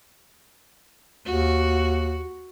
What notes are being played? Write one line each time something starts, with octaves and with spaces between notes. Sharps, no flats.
D#2 F#4